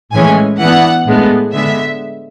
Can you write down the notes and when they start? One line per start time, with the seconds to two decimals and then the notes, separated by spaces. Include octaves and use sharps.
0.13 A2 E3 G#3 C#4 G#5
0.60 E3 B3 D4 F#5
1.07 A2 G#3 B3 D4
1.53 D3 G#3 B3 E5